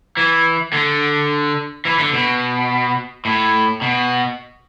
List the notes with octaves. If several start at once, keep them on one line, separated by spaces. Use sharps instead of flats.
E3
D3
E3
D3
B2
A2
B2